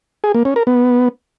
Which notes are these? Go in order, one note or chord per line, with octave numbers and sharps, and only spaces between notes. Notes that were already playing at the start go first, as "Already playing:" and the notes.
G#4
A#3
C#4
A#4
B3